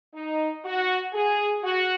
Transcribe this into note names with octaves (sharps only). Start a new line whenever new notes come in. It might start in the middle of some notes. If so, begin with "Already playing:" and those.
D#4
F#4
G#4
F#4